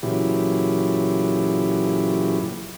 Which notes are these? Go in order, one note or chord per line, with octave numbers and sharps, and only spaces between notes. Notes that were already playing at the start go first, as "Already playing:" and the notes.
A#2 C#3 E3 F#3 E4 G4